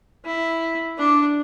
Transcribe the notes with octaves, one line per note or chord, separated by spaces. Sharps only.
E4
D4